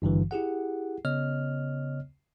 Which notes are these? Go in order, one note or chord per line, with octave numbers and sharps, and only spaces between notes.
G#1 G2 D3 E3
E4 G4 G#4 F#5
C#3 B3 C#5 D#5 F6